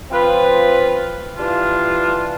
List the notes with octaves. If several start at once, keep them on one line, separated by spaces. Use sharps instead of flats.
F3 C4 F4 B4
E3 G3 D4 F4